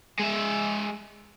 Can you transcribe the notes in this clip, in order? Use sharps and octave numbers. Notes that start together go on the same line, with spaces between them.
G#3 E5